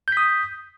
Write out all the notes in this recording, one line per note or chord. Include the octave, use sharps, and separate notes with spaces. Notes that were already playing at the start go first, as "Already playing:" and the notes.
D#6 G6 B6